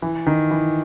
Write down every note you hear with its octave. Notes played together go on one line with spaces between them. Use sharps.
E3
D#3
E3